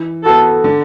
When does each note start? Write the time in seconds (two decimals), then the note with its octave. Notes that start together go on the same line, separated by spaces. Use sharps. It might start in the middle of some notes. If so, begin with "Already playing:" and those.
Already playing: E3
0.24 B3 F#4 A4
0.64 D3